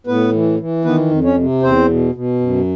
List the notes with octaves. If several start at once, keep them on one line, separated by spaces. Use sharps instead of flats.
A2 B3 B4
E3
E3
D#3 B3 B4
F2
C#4 C#5
C3
E2 C4 C5
B2
B2
F#2